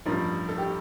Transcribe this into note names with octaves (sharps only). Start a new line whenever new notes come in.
A1 G2 F3 A#4
A4
G4